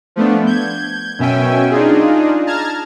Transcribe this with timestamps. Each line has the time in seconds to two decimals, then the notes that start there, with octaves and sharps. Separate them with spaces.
0.16 F3 A3 B3 D4
0.46 G6 G#6
1.18 F#2 B2 C#4 E5 G5 G#5
1.71 D4 D#4 F4 G#4
2.46 A5 A#5 F6 G#6